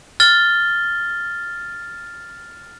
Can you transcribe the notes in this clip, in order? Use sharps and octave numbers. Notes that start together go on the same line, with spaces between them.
F6 A6 G7